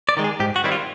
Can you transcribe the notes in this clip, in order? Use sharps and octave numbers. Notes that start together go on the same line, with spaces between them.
D5
D#3 G#3
G#4
G#2 G4
F#4
D#3 G3 C4 E4
F4